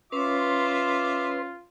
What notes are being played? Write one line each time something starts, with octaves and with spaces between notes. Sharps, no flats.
C#4 F4 B4 C#5 E5 C6 D6